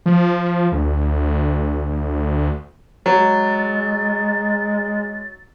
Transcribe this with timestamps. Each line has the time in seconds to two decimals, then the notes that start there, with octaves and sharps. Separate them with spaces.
0.06 F3
0.72 D2
3.06 F#3 G#3 A6